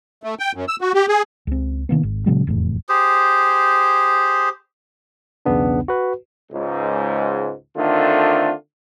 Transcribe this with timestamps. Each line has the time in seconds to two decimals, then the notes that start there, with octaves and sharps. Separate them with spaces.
0.23 A3
0.39 G5
0.55 F#2
0.68 E6
0.81 F#4
0.94 G4
1.09 G#4
1.47 C#2 C4
1.89 C3 D#3 A#3 B3
2.03 G#1
2.26 A#2 C#3 F#3 G#3
2.47 F1 E2 A2
2.89 G4 G#4 C5
5.46 B1 E2 C#3 B3 D4
5.88 F#4 B4
6.52 C#2 G#2
7.77 D3 D#3 A3 C4 D4 F4